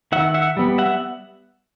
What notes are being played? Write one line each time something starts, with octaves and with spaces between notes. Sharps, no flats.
D#3 E5 F#5
E5 F#5
G3 B3
E5 F#5